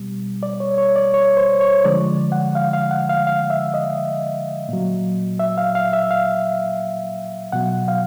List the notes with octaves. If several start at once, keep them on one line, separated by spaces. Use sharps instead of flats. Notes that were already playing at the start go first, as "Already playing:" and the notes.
Already playing: B2 G3
D5
C#5
C#5
D5
C#5
C5
C#5
D3 F3 G#3 D5
F#5
F5
F5
F#5
F5
F5
E5
D#5
A#2 F#3
E5
F5
F5
E5
F5
B2 F#3 F#5
F5